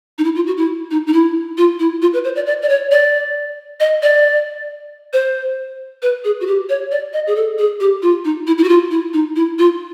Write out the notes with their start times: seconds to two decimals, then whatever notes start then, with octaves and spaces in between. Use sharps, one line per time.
0.18 D#4
0.24 E4
0.35 F4
0.47 F#4
0.57 E4
0.91 D#4
1.07 D#4
1.13 E4
1.58 F4
1.80 E4
2.02 F4
2.13 B4
2.24 C5
2.36 D5
2.46 D5
2.62 D5
2.69 C#5
2.91 D5
3.80 D#5
4.02 D5
5.13 C5
6.02 B4
6.24 G#4
6.41 F#4
6.47 G4
6.69 C#5
6.91 D5
7.13 D#5
7.27 G#4
7.36 A4
7.58 G#4
7.80 G4
8.02 F4
8.25 D#4
8.47 E4
8.58 E4
8.64 F#4
8.69 F4
8.91 E4
9.13 D#4
9.36 E4
9.59 F4